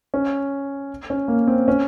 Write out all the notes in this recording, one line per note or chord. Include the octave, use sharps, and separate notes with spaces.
C#4
C#4
A#3
C4
C#4